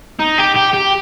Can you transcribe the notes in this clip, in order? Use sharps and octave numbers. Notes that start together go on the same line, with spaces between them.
D#4
G4
G4
G4